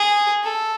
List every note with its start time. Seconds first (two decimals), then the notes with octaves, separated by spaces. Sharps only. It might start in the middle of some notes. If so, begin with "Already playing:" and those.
Already playing: G#4
0.44 A4